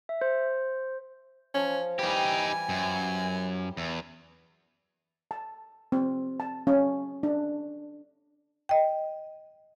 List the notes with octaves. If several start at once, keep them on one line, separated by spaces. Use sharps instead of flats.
E5
C5
F3 C#4
E3 G3 D#4 G4 G#5
F#2
E2
A5
C4
A5
C#4
D4
D#5 G5